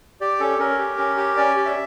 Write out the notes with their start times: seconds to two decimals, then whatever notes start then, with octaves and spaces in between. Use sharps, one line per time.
0.21 G4 D5
0.40 C#4 A4
0.59 C#4 A#4
0.79 G4
0.98 C#4
1.17 G4
1.37 C#4 D5
1.56 G4
1.66 E5